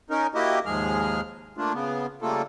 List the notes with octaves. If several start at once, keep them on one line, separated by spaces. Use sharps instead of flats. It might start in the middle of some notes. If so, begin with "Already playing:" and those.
C#4 D#4 A#4
A#3 E4 F#4 G4 D#5
D#2 G#2 F3 G#3 G#4 F6
A3 A#3 D4 F4
C#3 B3
C#3 G3 A3 A#3 F4 A4